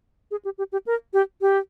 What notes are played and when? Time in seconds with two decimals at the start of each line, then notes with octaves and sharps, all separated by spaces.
0.31 G#4
0.45 G4
0.58 G4
0.72 G4
0.86 A#4
1.13 G4
1.41 G4